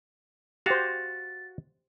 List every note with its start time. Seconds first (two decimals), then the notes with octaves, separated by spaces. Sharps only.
0.66 F#4 G4 C5 F5 A6